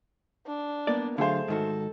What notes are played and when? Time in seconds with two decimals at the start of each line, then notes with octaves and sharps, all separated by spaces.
0.47 D4
0.87 A#3 B3 D5
1.18 D3 F#3 A3 G#4 C5 F5
1.48 G#2 D#3 F#4 A4